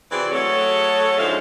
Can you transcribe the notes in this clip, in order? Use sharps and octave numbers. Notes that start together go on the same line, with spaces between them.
C3 E3 C4 F#4 G#4 D5
F#3 A3 G#4 A4 C#5
G#2 D3 F3 G#3 E5 F5